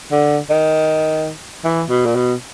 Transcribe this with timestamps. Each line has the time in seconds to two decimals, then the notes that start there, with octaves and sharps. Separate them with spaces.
0.11 D3
0.50 D#3
1.64 E3
1.90 B2
2.06 A#2
2.15 B2